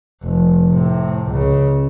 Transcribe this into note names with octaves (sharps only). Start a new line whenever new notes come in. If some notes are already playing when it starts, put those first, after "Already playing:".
F1
A2 C3
C#2 C#3